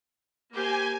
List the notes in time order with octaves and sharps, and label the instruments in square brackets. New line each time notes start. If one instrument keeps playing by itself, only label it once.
[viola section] A#3 G4 C5 [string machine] G#5